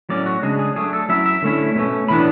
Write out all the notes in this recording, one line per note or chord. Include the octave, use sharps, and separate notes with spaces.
A2 F#3 C#4 D5
F#4
C#3 G#3 D4 G#4
G#4
F#3 A3 D4 G#4
A4
F#3 C#4 E4 E5
E5
D3 A3 C#4 E4
B2 A3 C#4
A2 E3 B3 D4 B5